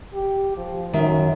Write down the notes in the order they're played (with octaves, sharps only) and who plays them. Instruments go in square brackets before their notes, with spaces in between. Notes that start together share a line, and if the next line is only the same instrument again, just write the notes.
[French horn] G4
F3
[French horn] F#2 [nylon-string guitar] D#3 E5